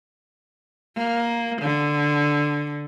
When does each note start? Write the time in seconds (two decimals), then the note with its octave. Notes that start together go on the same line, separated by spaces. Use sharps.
0.97 A#3
1.61 D3